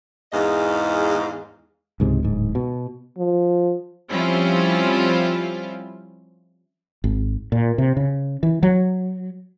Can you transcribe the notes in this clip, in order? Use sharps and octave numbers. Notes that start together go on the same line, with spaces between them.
E2 G#2 D#5 F5
C#2 G#2 C3
D1 G#2
B2
F3
F3 G3 C4 C#4 E4 F4
G#1
A#2
C3
C#3
E3
F#3